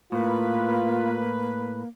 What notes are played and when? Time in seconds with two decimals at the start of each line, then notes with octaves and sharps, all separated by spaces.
0.12 A2 A#3 F4 B4